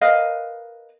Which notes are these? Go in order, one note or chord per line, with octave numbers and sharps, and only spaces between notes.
A#4 B4 D#5 F5